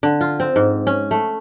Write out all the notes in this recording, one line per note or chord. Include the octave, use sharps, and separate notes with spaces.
D3
F4
C4
G#2
C#4
A3